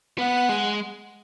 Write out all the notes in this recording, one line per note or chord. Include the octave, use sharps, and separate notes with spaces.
B3 F#5
G#3